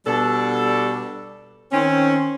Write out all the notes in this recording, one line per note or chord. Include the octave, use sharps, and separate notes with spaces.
B2 G3 D4 A4
D#3 C4 C#4